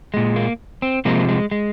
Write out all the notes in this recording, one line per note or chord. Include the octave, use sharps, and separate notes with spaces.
A#2 G#3
A#3
C4
C3 F3 G#3 A#3
G#3
G#3